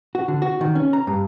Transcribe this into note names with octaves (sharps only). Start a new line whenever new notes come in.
F#4
D3
F#4
D#3
C#4
A#5
G2